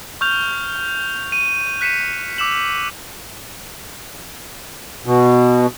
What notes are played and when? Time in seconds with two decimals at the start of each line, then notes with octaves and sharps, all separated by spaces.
0.21 C#6 F6 G6 F7
1.32 D#7
1.81 F#6 B6 C#7 D#7 E7
2.38 D6 E6 E7 F#7
5.06 B2